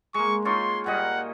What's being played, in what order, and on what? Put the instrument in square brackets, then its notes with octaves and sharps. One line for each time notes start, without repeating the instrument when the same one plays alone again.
[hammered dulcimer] G#3 A#3 [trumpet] C#6
[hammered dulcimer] D#4 F4 C#5 [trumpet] C6
[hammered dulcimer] A#2 G3 D#5 [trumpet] F#5